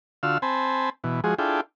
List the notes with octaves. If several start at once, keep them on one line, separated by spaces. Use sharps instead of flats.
D3 F4 F#4 F5 E6
C4 C5 G#5 A5 B5
B2 E3
F3 G#3 F#4 G#4
D4 E4 F4 G#4 A4 G5